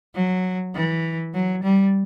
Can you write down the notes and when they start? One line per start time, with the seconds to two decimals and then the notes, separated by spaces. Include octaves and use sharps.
0.15 F#3
0.75 E3
1.34 F#3
1.63 G3